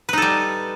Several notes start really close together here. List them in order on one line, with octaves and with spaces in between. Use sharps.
B4 D#4 A4 G3